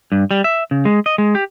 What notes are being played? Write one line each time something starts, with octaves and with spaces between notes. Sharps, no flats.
G2
G3
E5
C#3
G#3
D#5
G#3
G4